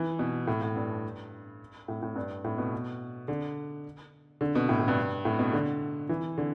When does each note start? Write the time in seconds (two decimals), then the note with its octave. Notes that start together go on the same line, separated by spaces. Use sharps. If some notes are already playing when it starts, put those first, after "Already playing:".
Already playing: E3
0.19 B2
0.47 A2
0.62 A2
0.76 G2
1.88 A2
2.02 A2
2.16 G2
2.44 A2
2.58 B2
3.28 D3
4.41 D3
4.55 B2
4.69 A2
4.79 A2
4.88 G2
5.25 A2
5.39 B2
5.53 D3
6.09 E3
6.38 D3